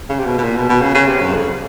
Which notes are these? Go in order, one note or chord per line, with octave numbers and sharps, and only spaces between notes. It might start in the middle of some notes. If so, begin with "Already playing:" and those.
C#3
C3
B2
B2
A#2
B2
B2
C#3
C#3
C3
F#2
F2